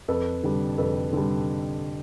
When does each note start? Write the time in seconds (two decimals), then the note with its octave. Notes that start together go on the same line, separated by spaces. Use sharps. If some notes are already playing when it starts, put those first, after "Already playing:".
0.08 F2 A4 B4
0.43 D3 G3
0.78 F2 A4 B4
1.13 D3 G3